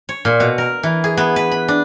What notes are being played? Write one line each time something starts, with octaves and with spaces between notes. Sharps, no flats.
C#5
A#2
B2
A#4
E3
G#4
B3
B4
B5
D4